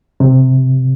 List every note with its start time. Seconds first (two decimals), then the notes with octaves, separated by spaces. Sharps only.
0.20 C3